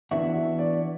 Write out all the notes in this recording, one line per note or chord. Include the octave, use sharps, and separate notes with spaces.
E3 B3 D4 E4 F#4 E5
E4 E5
D5